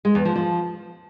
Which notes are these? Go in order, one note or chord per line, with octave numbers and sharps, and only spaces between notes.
G#3
E2
F3
F3